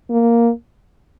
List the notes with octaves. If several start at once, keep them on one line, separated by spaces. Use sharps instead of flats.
A#3